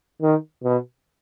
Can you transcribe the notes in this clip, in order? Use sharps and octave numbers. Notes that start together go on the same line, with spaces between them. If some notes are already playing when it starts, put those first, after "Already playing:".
D#3
B2